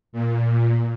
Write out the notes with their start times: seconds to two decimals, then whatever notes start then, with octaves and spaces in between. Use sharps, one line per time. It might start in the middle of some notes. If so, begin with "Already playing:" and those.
0.12 A#2